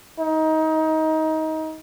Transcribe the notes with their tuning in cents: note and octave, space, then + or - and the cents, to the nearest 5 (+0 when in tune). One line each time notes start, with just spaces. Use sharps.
D#4 +25